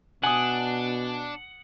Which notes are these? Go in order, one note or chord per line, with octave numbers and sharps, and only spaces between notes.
B2 D4 F#5 G#5 D#6